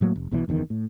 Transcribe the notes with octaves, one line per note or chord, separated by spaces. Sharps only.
A2 F#3 G3 A#3
F1
B1 B2 D#3 E3
F#1 E2 A2 D#3
A2